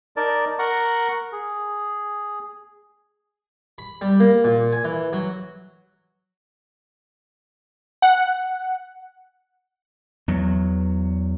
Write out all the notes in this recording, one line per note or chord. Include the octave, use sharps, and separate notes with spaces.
D#4 A#4 D5 A5
A#4 F#5 A#5 C#6
G#4
B5
G3
A#3
A#2
G#5
E3
F#3
F#5
E2 F#3